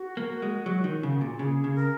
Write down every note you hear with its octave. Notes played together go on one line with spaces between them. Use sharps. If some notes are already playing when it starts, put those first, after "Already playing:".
Already playing: F#4
A#3
G#3
F#3
D#3
C#3
A#2
C#3 G#4
C#3
A#4